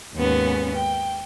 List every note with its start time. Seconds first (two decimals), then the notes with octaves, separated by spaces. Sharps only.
0.14 D#2 G#2 B3 C#4
0.76 G5